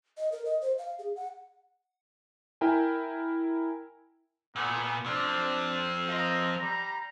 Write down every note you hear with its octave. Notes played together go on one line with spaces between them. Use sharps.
D#5
A#4
D#5
C5
F5
G#4
F#5
E4 A#4 G5 G#5
A#2 A3 B3
F3 C4 D4
F4 A#4 D#5
G3 A#5